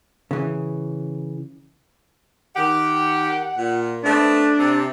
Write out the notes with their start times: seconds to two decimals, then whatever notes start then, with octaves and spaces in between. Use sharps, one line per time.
0.31 C#3 E3
2.56 D#3 G4 F#5
3.57 A#2
4.03 A3 B3 C4 D4
4.59 C3